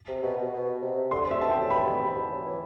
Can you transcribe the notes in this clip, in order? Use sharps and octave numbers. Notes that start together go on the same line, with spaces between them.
C3
B2
B2
B2
C3
D3 C6
C3 E5
B2 A5
G5
A2
G2 B5
B2
C3
E3
F#3
E3